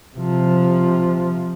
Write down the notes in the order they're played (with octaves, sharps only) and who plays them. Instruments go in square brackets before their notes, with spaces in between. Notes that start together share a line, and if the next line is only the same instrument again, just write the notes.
[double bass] C3 F3